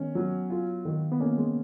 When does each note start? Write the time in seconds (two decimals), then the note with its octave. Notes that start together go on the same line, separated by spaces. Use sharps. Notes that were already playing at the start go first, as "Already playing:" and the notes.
Already playing: D#3 G#3 B3 C#4
0.15 F#3
0.50 F4
0.85 D#3
1.12 B3
1.20 A#3 C#4
1.38 G#3